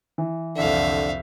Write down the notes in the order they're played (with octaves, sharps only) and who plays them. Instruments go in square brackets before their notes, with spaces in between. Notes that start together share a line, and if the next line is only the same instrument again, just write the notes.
[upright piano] E3
[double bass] C2 F2 [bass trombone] D3 [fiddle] E5 F5